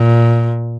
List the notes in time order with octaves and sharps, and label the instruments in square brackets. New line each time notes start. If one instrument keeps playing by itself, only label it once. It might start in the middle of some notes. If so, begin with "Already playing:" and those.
Already playing: [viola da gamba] A#2